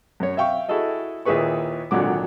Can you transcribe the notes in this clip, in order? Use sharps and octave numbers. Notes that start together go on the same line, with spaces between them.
F#2 C#5
E5 F5 G5 C#6
E4 F#4 G#4 A4 D#5
D#2 A#2 E4 G#4 B4 C#6
G#1 A#2 D3 F#3 D6